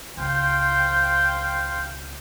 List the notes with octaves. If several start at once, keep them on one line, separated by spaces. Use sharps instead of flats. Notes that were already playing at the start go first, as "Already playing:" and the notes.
C#2 C5 F5 G5